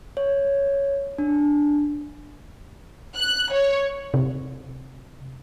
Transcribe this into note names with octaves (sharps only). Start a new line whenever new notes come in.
C#5
D4
F#6
C#5
C3